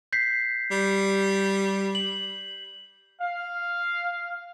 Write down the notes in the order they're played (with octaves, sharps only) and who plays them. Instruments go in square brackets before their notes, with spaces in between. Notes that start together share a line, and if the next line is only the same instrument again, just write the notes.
[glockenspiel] G6 B6 C7
[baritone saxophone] G3
[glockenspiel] F#7
[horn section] F5